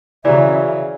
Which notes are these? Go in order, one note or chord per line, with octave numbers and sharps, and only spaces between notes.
C#3 E3 F#3 D5 E5 A#5